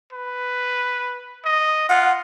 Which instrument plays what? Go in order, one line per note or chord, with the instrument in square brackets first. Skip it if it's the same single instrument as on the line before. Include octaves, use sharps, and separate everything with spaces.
[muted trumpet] B4
D#5
[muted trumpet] F4 [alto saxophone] F#5